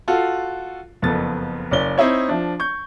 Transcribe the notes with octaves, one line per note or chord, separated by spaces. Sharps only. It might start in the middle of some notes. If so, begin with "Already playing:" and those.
F4 F#4 A4 F5
F#1 F2 B3 A4 A6
F#1 C#4 D5 G7
C4 D#4 E4 C#5
F3 D4
C#6 G6